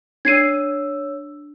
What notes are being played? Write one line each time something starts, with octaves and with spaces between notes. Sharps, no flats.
D4 C#5 E6 G#6 C7 D#7